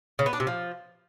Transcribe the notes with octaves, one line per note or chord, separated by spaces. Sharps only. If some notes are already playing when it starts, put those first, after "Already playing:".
C#3
B3
D4
C3
F3